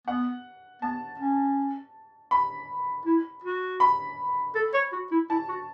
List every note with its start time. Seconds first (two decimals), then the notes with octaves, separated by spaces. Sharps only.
0.07 B3 F#5
0.82 B3 A5
1.20 C#4
2.31 B5
3.05 E4
3.44 F#4
3.80 B5
4.55 A4
4.74 C#5
4.93 F#4
5.11 E4
5.30 E4 A5
5.49 F#4